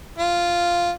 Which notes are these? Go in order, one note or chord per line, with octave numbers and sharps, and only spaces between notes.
F4